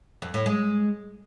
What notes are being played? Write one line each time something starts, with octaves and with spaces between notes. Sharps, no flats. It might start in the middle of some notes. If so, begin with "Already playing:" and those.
F2
A2
G#3